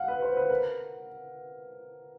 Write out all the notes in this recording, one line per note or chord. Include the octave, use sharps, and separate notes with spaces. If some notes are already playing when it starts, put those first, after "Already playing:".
Already playing: F5 F#5
B4
C5
B4
A#4